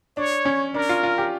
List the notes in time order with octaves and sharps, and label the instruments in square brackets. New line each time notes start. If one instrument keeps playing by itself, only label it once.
[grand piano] D4 [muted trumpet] C#5
[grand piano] C#4
[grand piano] D4 [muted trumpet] A#4
[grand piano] F4
F4
G4